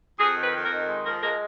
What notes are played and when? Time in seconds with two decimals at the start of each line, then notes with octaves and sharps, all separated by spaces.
0.20 F2 G#4
0.37 D#3
0.43 B4
0.54 F2
0.65 A#4
0.71 D#3
0.88 G#3
1.05 F3 A#4
1.22 G#3 A#4